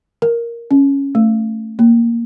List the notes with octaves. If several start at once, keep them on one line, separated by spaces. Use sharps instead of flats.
A#4
C#4
A3
A#3